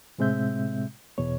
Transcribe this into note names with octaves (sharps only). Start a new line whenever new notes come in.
A2 C3 G#3 C4 E5 G6
E2 B2 C#5